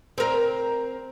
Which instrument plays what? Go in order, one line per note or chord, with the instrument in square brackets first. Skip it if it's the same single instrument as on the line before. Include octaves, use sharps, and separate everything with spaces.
[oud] C4 A#4